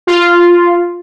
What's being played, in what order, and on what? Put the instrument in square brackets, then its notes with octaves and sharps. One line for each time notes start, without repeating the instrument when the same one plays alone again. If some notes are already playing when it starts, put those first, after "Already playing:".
[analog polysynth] F4